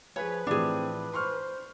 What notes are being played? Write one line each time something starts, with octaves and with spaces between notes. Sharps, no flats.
F3 G#4 B4 C#5 G#5
A2 E3 F3 C4 D4 G#4
C5 C6 C#6 F6